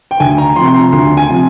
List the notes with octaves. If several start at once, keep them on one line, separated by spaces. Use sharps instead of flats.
G5
D2 G#5
A#5
C3 F3 C6
C6
A#5
D2 C6
G#5
C3 F3